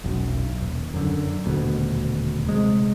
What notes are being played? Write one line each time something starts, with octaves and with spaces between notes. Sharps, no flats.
E1 B1 F#2
D#1
F#2 D3
D#1 D2 B2
C3 G#3